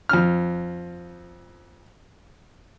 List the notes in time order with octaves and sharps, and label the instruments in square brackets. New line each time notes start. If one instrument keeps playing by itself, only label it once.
[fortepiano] F2 F6